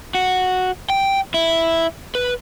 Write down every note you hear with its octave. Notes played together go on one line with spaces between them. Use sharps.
F#4
G5
E4
B4